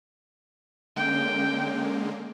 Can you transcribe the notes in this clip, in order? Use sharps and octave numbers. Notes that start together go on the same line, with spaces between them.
D3 G#3 A#3 C#4 G5